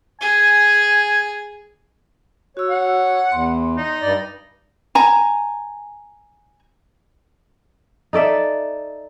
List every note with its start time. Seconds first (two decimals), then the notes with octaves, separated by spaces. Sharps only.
0.21 G#4 G#5
2.57 F#4 C#5 E6
2.69 F#5
3.32 E2 C6
3.77 D#4
4.02 G2 D5
4.95 G#5 A#5
8.13 D#4 A4 D5 E5